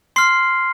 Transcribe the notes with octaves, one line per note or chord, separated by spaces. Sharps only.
C6 F6 C7